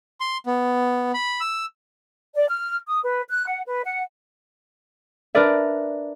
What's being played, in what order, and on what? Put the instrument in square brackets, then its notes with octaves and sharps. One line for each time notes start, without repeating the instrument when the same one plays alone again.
[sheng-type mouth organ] C6
B3
B5
E6
[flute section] D5
F6
D#6
B4
F#6
F#5
B4
F#5
[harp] D4 A#4 B4 D5 E5